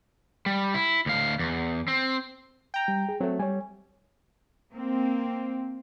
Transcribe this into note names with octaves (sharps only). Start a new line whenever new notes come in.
G3
E4
D2 F5
E2
C4
G5 A#5
G3
G#4
F#3 A3 C4
G3 C#5 G#5
A#3 C4